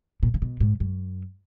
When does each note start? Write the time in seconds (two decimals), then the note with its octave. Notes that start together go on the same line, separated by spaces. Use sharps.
0.23 A#2
0.34 C#3
0.42 B2
0.60 G#2
0.80 F#2